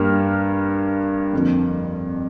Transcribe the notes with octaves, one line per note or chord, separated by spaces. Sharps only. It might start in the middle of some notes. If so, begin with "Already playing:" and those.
Already playing: G2 G3 A#3 F6
F2 D3 F3 A#3